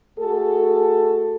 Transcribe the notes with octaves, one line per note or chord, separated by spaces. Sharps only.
A3 F#4 G#4 A4